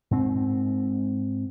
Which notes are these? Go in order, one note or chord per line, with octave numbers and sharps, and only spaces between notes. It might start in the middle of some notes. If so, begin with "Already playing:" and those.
G#2 C4